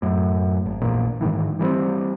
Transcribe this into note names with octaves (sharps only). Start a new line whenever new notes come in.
F#2 A2
G#1
A#1 E2 A#2
G#2 C3 D#3 E3
E3 G3 A3 C4